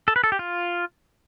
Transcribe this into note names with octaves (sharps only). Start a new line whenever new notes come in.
A4
B4
A4
G4
F4